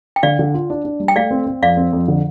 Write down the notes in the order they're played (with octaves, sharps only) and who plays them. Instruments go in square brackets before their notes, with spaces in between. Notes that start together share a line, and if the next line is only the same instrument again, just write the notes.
[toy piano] G5
[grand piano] D3 [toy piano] D5 F5
[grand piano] D3
F4
D4
D4
G3
[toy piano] G5
[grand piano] A3 [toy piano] D5 F5
[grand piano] C4
C4
[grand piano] F2 [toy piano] D5 F5
[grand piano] C4
F2
D3